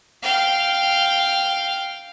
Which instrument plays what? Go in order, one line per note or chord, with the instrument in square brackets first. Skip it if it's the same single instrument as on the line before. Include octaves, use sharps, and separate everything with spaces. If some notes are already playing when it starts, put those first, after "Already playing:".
[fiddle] F5 G5